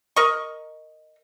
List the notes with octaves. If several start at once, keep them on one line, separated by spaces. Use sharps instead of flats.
A#4 D#5 C#6